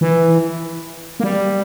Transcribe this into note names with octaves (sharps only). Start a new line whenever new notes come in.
E3
A#3
G3